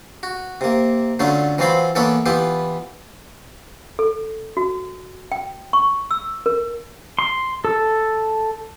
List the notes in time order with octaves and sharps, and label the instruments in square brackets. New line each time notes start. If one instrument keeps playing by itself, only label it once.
[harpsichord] F#4
C3 A#3
D3 F#3 A3 C#4 F4
E3 F#3 C4 F4 F5 B5
E3 A#3 B3 E4 A4 C#5
E3 B3 E4 F4 G4
[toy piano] A4
F#4
G5
C#6
E6
A#4
[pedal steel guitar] C6
A4